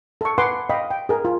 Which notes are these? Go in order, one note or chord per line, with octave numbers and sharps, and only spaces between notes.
A4 C#6
B4 F#5 G#5 C6 D6
D#5 F5 G5 B5
G5
G#4 A#4
F4